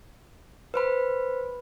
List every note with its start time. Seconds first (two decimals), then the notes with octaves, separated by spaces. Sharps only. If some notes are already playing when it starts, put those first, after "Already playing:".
0.74 B4 C5 B5